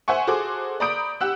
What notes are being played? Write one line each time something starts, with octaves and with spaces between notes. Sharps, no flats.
C5 E5 F#5 G#5 C#6
F#4 G#4 A4 C5 D6
D5 A#5 B5 D#6 G6 D7
G4 F#5 E6 F#6